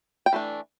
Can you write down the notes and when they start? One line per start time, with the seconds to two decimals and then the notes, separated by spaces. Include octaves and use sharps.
0.26 G5
0.33 E3 A3 D4